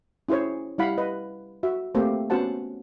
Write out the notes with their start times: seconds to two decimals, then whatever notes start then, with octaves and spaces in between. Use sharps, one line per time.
0.28 C#4 E4 G#4 C5 C#5
0.78 G3 E4 F5 F#5 B5
0.98 B4 D#5
1.63 F#4 E5
1.95 A3 A#3 C4 G4 C5
2.30 B3 C#4 F#4 C5 F#5 A5